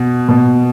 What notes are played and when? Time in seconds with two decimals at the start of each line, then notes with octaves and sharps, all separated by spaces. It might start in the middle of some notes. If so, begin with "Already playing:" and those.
Already playing: B2
0.29 B2